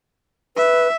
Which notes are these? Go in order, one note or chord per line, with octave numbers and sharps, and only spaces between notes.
B4 E5